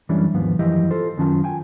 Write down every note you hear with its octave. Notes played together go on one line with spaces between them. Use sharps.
F#2 E3 G3 C#4 D4
D#2 G#2 F3 B3
F#2 E3 F3 E4 G4 D#5
F4 A4 C5
F#2 D#3 C#4 F4 A5
G5 G#5